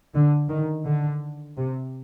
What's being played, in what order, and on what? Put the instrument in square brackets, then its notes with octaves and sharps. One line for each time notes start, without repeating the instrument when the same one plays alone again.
[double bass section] D3
D#3
D3
C3